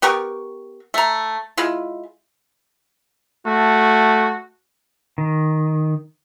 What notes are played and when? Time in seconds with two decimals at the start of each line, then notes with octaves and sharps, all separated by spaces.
0.02 B3 G4 A#4 C#6
0.94 A3 A#5
1.57 G#3 E4 F4
3.46 A3 F#4
5.18 D#3